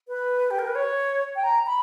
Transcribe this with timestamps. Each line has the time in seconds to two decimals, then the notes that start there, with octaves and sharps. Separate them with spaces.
0.08 B4
0.51 G4
0.59 A#4
0.67 B4
0.75 C#5
1.36 G5
1.44 A#5
1.67 B5